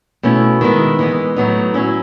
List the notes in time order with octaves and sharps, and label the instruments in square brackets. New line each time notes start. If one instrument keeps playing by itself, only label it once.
[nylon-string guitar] B2 A3 C#4 E4
D#3 G#3 B3 E4
E3 G#3 B3
A2 F#3 B3 D#4
F#3 C#4 E4